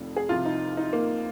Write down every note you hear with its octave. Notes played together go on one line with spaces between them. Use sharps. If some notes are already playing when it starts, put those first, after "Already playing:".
Already playing: F1 F2 D#3
G#4
C2 C3 F3 F4
D#4
D#4
A#3